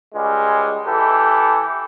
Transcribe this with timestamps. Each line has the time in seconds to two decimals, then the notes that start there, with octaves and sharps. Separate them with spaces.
0.15 C#2 G3 G#3
0.87 E3 G4 A4